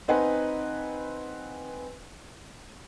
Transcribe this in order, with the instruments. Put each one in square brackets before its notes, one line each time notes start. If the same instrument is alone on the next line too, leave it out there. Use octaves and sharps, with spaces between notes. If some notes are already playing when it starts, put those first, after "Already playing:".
[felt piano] C4 D#4 B4 F#5 G#5